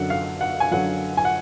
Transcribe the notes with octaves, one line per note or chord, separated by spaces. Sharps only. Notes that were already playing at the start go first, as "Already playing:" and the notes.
Already playing: F#2 D3 F#3 F#5
F5
F#5
G#5
F#2 D3 F#3 F#5
G#5
F#5